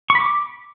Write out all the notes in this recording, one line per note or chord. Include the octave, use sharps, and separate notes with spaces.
C#6
B5
D6